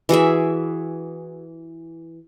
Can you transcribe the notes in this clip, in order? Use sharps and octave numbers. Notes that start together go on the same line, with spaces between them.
E3 F#4 G#4 E5